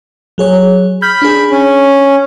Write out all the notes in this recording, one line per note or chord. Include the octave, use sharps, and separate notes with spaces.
F#3 G#4 C#5
B5 F6 G6
D4 G#4
C#4